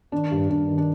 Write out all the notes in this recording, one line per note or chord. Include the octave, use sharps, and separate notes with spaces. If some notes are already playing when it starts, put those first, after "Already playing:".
D#3 D4
G2
G2 D4
D#3
D4